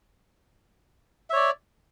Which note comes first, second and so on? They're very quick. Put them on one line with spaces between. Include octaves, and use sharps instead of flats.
E5 C#5 D5